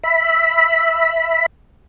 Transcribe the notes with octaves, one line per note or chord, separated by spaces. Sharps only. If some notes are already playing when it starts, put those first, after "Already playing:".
E5 B5